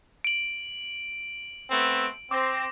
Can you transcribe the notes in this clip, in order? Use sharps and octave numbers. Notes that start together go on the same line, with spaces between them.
D7 F#7
A3 B3 C4
C4 D6 A#6